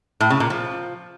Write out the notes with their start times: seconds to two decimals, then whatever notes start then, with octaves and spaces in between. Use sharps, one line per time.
0.20 A2
0.30 C#3
0.40 A#2
0.50 F3